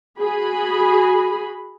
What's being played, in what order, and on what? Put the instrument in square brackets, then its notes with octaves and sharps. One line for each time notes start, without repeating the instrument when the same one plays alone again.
[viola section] F#4 G#4 B5